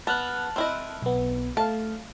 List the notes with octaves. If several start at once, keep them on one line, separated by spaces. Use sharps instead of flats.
B3 A5 F6 F#6
C4 E4 D#5
B1 B3
A3 F5 A5